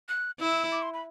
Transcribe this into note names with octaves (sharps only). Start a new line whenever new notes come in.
F#6
E4 E6
D6
C6
B5